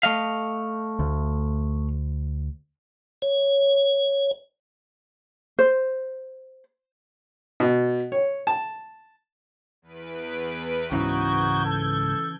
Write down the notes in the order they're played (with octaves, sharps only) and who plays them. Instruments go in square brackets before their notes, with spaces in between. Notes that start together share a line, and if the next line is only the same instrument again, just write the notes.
[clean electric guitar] A3 D#5 F5
[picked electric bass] D2
[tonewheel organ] C#5
[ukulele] C5
[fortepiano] B2
C#5
A5
[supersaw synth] E2 B4 D7
[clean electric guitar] C#2 G#2 [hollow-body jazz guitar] C#3 E3 [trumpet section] D#4 F#4 [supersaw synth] G6 G#6
[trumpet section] A4